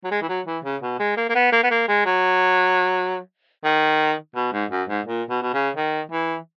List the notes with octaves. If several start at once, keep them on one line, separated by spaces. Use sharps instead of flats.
F#3
G#3
E3
F#3
E3
C#3
B2
G#3
A#3
A#3
B3
A#3
B3
A#3
G#3
F#3
D#3
B2
G#2
F#2
G#2
A#2
B2
B2
C#3
D#3
E3